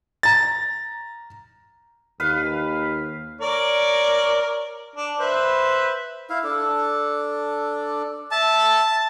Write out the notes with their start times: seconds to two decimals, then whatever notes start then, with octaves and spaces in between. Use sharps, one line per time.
0.23 A#5 A6
2.20 D#2 B4 F5
3.41 A#4 C#5 D5
4.96 D4
5.20 B4 C5 E5
6.30 E4 F5
6.44 D4 A4
8.31 E5 A5